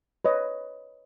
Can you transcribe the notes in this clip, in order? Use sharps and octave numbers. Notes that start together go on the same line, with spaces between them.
B4 C#5 D#5